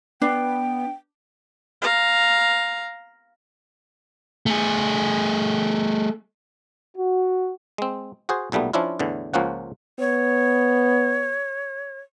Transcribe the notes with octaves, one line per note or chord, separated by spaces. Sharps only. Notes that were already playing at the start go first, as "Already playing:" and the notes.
B3 D4 G5
F5 A#5
A3 G#4
F#4
G#3 C4
F#4 G#4 C5
B1 A#2 G3 A3 B3
F3 C#4 D4 E4 F4
E2 A2 D3 E3
C#2 F3 A#3 C#4 F#5
B3 C#5